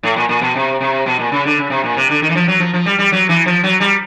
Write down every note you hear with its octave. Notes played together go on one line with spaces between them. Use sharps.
A2
A#2
A#2
B2
C3
C3
B2
A#2
C#3
D3
C#3
C3
A#2
C3
D3
D#3
E3
F3
F#3
F3
F3
G3
G3
F#3
E3
F3
F#3
G3